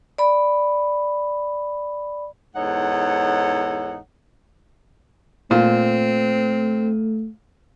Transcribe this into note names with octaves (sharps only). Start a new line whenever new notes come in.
D5 B5
E2 G#2 D#4 A4 C#5 F#5
A#2 A3 C4